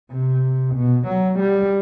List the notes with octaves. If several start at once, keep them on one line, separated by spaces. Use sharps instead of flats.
C3
B2
F#3
G3